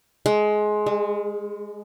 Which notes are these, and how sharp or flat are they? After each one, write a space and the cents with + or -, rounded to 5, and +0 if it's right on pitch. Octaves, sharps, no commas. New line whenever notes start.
G#3 +20
G#3 -30